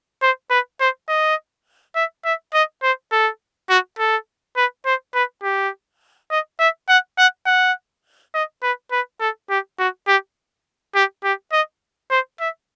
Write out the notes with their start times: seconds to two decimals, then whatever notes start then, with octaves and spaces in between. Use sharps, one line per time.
0.22 C5
0.50 B4
0.80 C5
1.09 D#5
1.96 E5
2.25 E5
2.54 D#5
2.83 C5
3.12 A4
3.70 F#4
3.99 A4
4.57 B4
4.86 C5
5.15 B4
5.43 G4
6.31 D#5
6.60 E5
6.89 F#5
7.18 F#5
7.46 F#5
8.35 D#5
8.63 B4
8.92 B4
9.21 A4
9.50 G4
9.79 F#4
10.08 G4
10.95 G4
11.24 G4
11.53 D#5
12.11 C5
12.40 E5